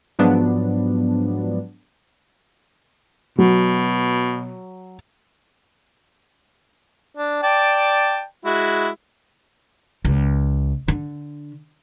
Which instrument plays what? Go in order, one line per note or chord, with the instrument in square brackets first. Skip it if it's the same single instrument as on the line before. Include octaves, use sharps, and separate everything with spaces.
[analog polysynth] G#2 F3 F#3 B3 D4
[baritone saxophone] B2 [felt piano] F#3
[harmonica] D4
D5 G5 A5
G#3 E4 F#4
[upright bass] C#2
D3